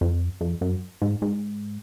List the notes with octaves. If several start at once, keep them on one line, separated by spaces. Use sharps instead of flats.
F2
F2
F#2
G#2
G#2